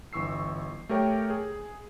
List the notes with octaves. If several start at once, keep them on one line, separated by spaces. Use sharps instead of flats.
G1 E3 C#6 E6 C7
A3 G4 A#4 C#5 G5
G#4